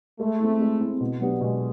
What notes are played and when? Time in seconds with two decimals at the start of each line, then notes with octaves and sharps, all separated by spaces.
0.20 G#3 A3
0.40 C4 E4
0.61 G#3
0.80 C4 E4
1.01 B2
1.21 F#3 B3 D4 G4
1.41 B2 G#3